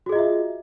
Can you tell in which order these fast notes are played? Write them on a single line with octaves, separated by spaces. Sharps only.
F#4 G#4 D#5 F4 E5